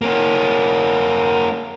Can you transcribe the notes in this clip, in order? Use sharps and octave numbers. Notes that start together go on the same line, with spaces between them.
A#3 C#4